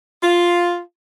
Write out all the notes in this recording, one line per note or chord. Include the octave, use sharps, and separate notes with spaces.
F4